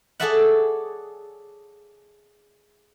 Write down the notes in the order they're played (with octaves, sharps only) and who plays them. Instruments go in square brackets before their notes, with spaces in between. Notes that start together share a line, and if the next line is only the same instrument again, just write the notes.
[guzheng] G#4 A4 C#5 D5 E5 F#5